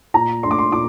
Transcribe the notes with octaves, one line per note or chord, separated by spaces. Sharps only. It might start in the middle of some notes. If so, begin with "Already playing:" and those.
A#2 A#5
A3 D4 C6 D6
C6
A#2 D6